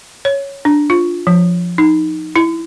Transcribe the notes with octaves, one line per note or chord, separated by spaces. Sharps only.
C#5
D4
F4
F3
D#4
E4